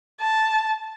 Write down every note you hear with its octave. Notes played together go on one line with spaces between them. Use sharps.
A5